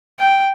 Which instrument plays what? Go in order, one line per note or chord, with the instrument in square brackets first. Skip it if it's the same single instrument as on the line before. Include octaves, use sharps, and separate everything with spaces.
[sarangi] G5